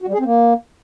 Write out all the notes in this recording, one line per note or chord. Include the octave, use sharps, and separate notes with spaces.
F#4
G3
G#4
C4
A#3